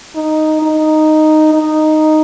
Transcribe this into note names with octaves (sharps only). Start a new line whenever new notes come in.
D#4
D#4
D#4